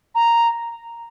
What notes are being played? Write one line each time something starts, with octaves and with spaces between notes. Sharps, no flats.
A#5